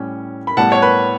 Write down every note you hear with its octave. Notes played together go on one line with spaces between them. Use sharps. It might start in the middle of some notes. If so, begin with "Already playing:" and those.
Already playing: A2 G3 C#4
B5
A2 G3 B3 F#5 A5
C#5
B4